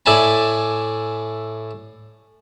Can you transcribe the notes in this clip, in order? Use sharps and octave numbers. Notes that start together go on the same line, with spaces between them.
A2 E4 D5 G#5 A5 B5